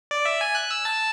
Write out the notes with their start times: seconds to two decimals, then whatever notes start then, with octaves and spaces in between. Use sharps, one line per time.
0.11 D5
0.25 E5
0.41 G#5
0.55 F#6
0.71 E6
0.85 A5